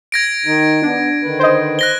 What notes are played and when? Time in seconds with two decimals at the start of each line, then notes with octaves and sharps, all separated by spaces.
0.12 G#6 A#6 D7
0.46 D#3 D#4
0.82 B3 D4
1.23 D3 D#3 B4
1.39 C5 D#5
1.79 F#6 A#6 G7